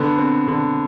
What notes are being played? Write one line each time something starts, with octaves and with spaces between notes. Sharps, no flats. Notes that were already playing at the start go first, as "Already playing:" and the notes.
Already playing: D3 B3
C4
D3